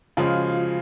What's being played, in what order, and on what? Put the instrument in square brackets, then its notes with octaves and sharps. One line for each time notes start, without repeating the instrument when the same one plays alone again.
[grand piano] C#3 F3 G#3 [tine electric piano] F4
[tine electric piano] F#4
F4